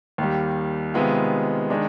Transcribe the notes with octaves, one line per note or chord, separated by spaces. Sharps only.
D#2 D#3 G3
C3 D#3 G#3 B3 F4
D#3 G#3 D4